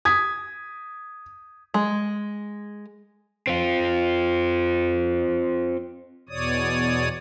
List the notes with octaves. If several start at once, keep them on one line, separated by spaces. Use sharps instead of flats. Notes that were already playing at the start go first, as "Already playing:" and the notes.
D#6 G#6 B6
G#3
C4 F4
E2 B2 C#5 D5 D#6